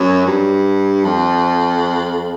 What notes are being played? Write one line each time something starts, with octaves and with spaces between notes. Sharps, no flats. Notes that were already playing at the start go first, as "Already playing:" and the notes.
Already playing: F#2
G2
F2